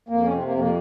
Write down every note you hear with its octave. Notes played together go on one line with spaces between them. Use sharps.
F2 A#3
C#4
C3 C4
A#3
F2
A#3